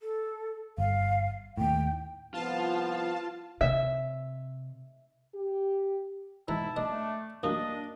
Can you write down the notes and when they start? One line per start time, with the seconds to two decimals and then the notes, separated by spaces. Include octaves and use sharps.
0.01 A4
0.78 G1 F5
1.57 D#2 A2 G5
2.34 C2 F3 B3 F4 F5 A5
3.61 C3 E5
5.35 G4
6.48 G#2 B2 E3 E4 A5 A#5
6.77 A#1 D4 D#5
6.90 A3
7.43 A1 F#2 A#3 D4 D#5